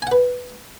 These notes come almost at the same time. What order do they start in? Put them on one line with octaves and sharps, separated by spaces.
G#5 F#5 B4